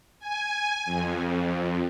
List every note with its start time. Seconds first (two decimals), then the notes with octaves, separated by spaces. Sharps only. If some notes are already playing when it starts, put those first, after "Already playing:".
0.20 G#5
0.85 F2